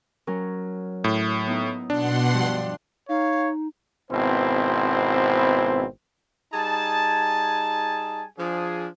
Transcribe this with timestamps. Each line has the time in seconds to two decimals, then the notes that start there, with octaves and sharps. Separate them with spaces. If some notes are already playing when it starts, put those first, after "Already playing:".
0.27 F#3 C#4 A#4
1.04 A2
1.47 B3 D#4 E4
1.90 B2 D4 F#5 C6
2.33 G2 F3
3.09 D#4 C#5 F5
4.11 G#1 B2 B3 C4 E4 C5
6.53 G3 D#4 G#4 G#5 A5
8.38 F3 D4 G#4